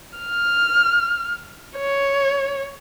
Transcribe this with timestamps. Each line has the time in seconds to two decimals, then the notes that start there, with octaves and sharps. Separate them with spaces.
0.19 F6
1.77 C#5